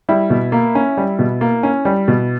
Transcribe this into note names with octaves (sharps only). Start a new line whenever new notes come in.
G3 E4
B2
A#3
C#4
G3
B2
A#3
C#4
G3
B2